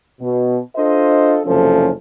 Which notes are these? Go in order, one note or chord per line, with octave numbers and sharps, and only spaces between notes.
B2
D4 F4 A4 C5 D#5
F#1 D2 C3 F3 C#4 A4